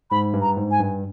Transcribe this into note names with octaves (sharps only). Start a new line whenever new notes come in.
G#2 B5
G2
A#5
G#2
G#5
G2